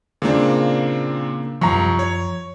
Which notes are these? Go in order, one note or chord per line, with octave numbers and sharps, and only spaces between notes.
A#2 C#3 A#3 C4 D4
C2 F#2 F3 A#5 C#6
C#5